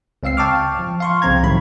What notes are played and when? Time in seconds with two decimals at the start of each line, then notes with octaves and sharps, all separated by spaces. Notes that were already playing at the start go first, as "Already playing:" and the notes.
0.23 C#2 C4 F5 E6 C7
0.37 G5 A5 C#6 D6 F6
0.79 F3
1.00 F5 C6 C#6
1.22 C2 C#3 F3 C4 A#5 G#6
1.43 A2 D#3 F#3 A3 B5